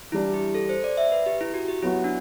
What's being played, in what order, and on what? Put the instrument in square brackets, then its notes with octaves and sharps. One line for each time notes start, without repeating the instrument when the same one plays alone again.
[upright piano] E3 G3 D4 [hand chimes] E4
[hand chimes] G4
A4
C5
D5
E5
B4
G4
E4
F#4
G4
[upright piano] F#3 B3 F#4 [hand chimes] E4
[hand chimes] D4